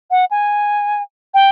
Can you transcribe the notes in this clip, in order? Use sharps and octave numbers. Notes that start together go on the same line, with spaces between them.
F#5
G#5
G5